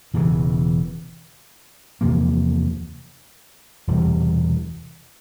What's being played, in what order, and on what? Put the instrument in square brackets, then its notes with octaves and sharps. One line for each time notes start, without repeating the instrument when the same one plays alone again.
[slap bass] E1 E2 C#3 E3
E2 C3 F3 A#3
E1 E2 C3 G3